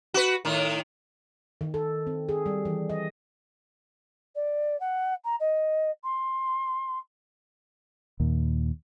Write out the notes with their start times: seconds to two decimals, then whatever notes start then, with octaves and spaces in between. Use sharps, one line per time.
0.14 F#4 B4
0.45 A2 D#3
1.61 D#3
1.74 A4
2.07 C4
2.29 G#4
2.46 G3
2.65 E3
2.90 D#5
4.35 D5
4.80 F#5
5.24 A#5
5.40 D#5
6.04 C6
8.20 D#2 A#2